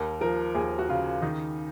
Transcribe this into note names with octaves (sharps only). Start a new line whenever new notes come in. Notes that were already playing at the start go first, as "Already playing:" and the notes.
Already playing: D#2 A#4
F3 A#4
D#2 G#4
F#4
C#3 F4
D#3 D#4